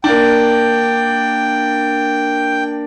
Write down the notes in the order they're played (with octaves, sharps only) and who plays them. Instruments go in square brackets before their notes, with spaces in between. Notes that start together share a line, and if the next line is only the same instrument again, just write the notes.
[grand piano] A#3 D4 [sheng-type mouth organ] G5